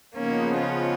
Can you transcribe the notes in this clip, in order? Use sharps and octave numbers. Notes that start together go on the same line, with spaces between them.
C#3 F3 A#3 B3 C#4 D#4
C#4 F4